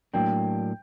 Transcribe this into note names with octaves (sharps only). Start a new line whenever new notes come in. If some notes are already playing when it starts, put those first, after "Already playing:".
A2 F#3 A#3 D4 G5